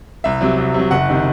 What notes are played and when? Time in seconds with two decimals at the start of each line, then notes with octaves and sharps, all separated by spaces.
0.24 C2 E5
0.41 C3 F#3
0.58 C2
0.74 C3 F#3
0.91 F#1 F#5
1.09 C3 D#3